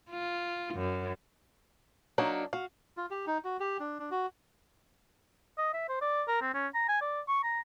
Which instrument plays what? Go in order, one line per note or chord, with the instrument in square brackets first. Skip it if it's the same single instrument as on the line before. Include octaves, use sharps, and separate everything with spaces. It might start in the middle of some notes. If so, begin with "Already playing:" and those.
[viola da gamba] F4
F#2
[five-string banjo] F#3 A#3 D#4 [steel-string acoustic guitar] D4 F#4
[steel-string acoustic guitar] F#4 [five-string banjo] F5
[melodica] F4
G4
D#4
F#4
G4
D4
D4
F#4
[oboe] D#5
E5
C5
D5
A#4
C4
C#4
A#5
G#5
D5
C#6
A#5